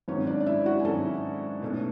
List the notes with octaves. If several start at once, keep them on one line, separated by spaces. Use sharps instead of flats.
G#1 G#2 F#3 C#4 C#5
D4 D5
D5
E4 E5
F#4 F#5
G#5
G#1 G#2 F#3 C#4 A4 A5
B1 B2 A3 C#4